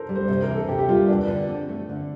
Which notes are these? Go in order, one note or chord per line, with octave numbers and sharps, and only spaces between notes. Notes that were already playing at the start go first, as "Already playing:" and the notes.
Already playing: A4 A#4 C5
G3
C5
C3 C5
A#4
E3
A4
C3 G4
G4
G3 F4
E2 D4
D3
C4
A3
D3